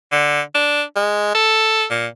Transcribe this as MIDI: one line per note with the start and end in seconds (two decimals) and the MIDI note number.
0.12 0.41 50
0.55 0.83 62
0.96 1.33 56
1.35 1.85 69
1.90 2.06 46